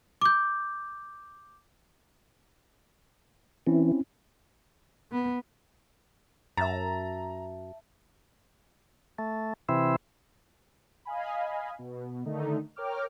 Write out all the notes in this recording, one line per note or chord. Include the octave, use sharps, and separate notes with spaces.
D6 G6
E3 C4 C#4 E4
B3
F#2 E5 A5 A#5 A6
A3
C3 E3 C4 E4
D#5 F5 G#5 B5
B2
D3 D#3 A3 D#4
A#4 C#5 G5 D6 F6